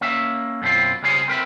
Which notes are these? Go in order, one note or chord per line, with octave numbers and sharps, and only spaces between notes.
A#3 C#4 E5
F#2 B2 C4 F4
C#2 C#3 G3 C#4 G#4 C5
C4 A#4 B4 E5